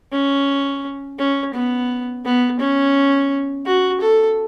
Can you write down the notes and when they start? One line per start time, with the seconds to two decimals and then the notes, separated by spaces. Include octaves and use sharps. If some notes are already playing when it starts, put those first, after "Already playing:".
0.12 C#4
1.19 C#4
1.54 B3
2.25 B3
2.60 C#4
3.66 F#4
4.01 A4